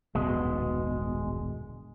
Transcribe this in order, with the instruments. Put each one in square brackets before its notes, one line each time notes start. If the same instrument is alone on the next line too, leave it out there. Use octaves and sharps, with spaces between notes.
[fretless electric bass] D#1 B2 [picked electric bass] A1 F#2 D3 [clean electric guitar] G#3